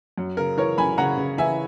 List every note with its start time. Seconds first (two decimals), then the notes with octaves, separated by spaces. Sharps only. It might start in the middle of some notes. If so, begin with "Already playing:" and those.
0.18 F#2
0.37 C#3 A#4
0.57 E3 A#4 C#5
0.78 F#2 G#5 B5
0.98 C#3 F#5 A#5
1.17 C#3
1.38 E3 E5 G#5